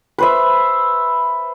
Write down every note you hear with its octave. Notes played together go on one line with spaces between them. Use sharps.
B4 C5 E5